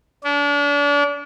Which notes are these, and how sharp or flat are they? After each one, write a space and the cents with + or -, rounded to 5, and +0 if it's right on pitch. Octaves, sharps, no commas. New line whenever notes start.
D4 -35